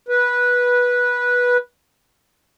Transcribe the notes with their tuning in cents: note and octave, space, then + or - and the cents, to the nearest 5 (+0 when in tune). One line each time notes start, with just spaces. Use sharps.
B4 -15